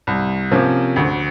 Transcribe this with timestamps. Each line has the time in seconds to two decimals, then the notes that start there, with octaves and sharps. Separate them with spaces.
0.07 C2
0.51 C3 F3 A#3 C#4
0.96 D2